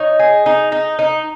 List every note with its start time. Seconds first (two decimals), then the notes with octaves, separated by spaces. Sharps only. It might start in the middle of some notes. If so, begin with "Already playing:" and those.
Already playing: D#4 C#5
0.19 G#4
0.46 D#4
0.72 D#4
0.99 D#4